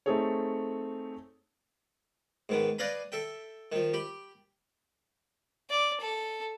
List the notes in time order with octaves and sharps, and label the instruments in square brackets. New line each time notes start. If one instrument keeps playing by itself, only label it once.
[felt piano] A3 C4 D#4 G#4 A4 C#5
[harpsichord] G#2 D#3 B3
B4 D5 D#5 F5 G#5 B5
A4 E5 G5
D#3 F3
G4 B5
[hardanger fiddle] D5
A4